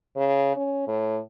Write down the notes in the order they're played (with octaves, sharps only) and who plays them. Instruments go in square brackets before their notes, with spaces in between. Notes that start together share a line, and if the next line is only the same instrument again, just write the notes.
[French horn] C#3
C#4
A2